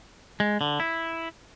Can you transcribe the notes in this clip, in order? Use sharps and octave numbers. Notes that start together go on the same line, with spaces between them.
G#3
D3
E4